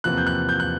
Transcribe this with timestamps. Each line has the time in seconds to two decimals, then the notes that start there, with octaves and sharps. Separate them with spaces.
0.04 E2 C3 F3 A#3 F#6
0.18 G6
0.27 F#6
0.49 G6
0.60 F#6